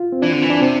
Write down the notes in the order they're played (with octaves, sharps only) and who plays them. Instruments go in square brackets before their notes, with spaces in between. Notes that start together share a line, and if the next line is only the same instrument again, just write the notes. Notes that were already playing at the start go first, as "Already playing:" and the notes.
Already playing: [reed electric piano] F4
C4
[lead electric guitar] E3 [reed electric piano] D4
[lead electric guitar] D3
E3
[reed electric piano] D4
[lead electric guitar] C3 [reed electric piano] C4